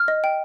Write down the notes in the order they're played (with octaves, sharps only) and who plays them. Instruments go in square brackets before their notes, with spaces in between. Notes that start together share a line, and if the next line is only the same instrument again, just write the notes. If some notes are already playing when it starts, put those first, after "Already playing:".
Already playing: [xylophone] F6
D#5
G5